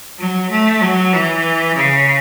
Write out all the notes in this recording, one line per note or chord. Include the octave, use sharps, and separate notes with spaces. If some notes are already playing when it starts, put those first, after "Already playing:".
F#3
A3
F#3
E3
C#3